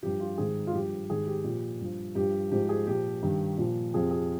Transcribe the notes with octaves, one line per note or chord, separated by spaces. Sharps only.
G2 F3 G4
F4
G#2 D#3 G#4
F4
G2 F3 G4
G#2 D#3 G#4
G4
A#2 F3
G2 F3
G2 F3 G4
G#2 F3 G4
G#4
A#2 F3 G4
G2 D#3
A#2 F3
F2 C3 F3 G#4
G#4